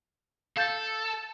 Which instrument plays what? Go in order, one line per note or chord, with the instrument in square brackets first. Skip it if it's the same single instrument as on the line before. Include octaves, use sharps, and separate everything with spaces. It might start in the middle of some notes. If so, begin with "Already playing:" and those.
[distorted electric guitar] A4 [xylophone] F5 G6 A6